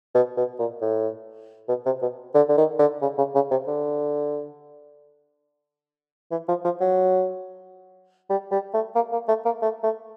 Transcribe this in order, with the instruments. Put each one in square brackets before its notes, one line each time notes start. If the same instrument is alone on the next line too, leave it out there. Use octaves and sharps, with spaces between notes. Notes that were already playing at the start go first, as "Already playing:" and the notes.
[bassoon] B2
B2
A#2
A2
B2
C3
B2
D3
D3
D#3
D3
C#3
C#3
C#3
C3
D3
E3
F3
F3
F#3
G3
G3
A3
A#3
A#3
A3
A#3
A3
A3